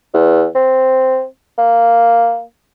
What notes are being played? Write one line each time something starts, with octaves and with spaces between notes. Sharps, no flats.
E2
C4
A#3